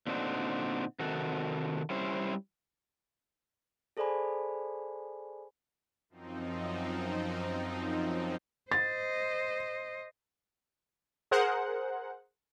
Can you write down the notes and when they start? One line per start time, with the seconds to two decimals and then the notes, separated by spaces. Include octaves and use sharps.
0.07 A#2 D3 C4 D4 D#4 F#4
1.00 C3 D#3 F#4 A4
1.90 G3 C#4 E4 C5
3.97 G#4 A4 C5 D5 G#5 B5
6.09 F#2 F3 C4 D#4
8.72 C5 D#5 A6
11.31 G#4 A#4 C5 F#5